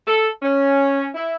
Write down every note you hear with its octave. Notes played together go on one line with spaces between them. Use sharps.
A4
C#4
E4